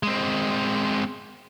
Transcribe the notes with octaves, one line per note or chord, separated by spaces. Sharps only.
G#3 C4